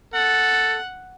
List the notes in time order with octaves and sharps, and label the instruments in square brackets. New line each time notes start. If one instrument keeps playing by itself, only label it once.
[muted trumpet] A4 [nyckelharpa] F#5